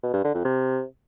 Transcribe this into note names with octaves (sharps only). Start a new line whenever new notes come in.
B2
G2
D3
F2
C3